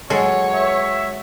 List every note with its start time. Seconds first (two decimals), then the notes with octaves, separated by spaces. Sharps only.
0.10 F#3 G#3 A4 C#5
0.54 E5